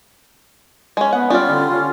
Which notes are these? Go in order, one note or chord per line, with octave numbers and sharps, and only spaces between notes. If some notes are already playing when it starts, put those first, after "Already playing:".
G#3 C#4
B3 F#5
G3 C#4 F4 D5
D3
C#4